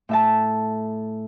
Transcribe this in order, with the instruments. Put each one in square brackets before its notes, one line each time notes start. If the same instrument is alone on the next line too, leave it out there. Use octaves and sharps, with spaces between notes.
[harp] A2 E5 A5